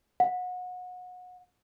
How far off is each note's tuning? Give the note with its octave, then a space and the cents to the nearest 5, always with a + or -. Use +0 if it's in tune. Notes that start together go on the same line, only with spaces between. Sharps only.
F#5 -30